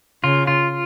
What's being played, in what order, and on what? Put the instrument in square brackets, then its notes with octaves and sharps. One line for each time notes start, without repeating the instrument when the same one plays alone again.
[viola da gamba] C#3 [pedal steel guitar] F4
[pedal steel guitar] F4